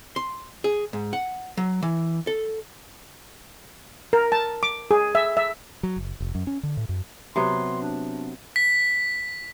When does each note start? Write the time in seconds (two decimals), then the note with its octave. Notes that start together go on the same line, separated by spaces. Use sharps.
0.16 C6
0.64 G#4
0.93 G#2
1.13 F#5
1.57 F#3
1.83 E3
2.27 A4
4.13 A#4
4.32 A5
4.63 D6
4.91 G#4
5.15 E5
5.37 E5
5.83 F#3
5.96 F#1
6.20 F1
6.35 F#2
6.47 C#4
6.63 D3
6.77 A2
6.89 F#2
7.36 C3 F#3 B3 C6
7.81 D4
8.56 B6